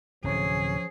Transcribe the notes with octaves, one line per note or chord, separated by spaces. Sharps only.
D1 C3 F3 C#4 G#4